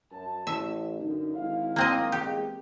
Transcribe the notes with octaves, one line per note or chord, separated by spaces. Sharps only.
F#2 A5
A1 E5
F#2 D3 D#4
G#1 E4 F5
A#3 C4 D#5
E2 G#3 G4